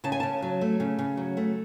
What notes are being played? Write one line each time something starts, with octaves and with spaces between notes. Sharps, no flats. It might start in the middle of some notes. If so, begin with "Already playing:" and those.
C#3 A5
G#5
C#3 A5
F#3
A3
C#3
C#3
F#3
A3